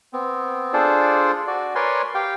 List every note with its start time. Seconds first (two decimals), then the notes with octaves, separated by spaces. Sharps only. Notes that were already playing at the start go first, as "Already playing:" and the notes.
0.13 B3 C4
0.73 D4 F4 G#4 A4 C5 D5
1.47 F#4 D5
1.75 A#4 B4 C#5 D5 G#5 C6
2.15 G4 F5 G5